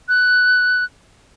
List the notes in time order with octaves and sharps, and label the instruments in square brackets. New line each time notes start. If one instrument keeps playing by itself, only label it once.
[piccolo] F#6